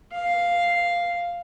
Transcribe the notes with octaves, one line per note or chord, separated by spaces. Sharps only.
F5